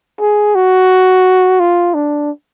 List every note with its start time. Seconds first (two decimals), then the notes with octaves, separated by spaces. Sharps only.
0.20 G#4
0.55 F#4
1.60 F4
1.94 D4